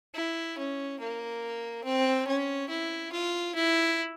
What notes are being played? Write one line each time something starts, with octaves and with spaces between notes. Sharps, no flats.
E4
C#4
A#3
C4
C#4
E4
F4
E4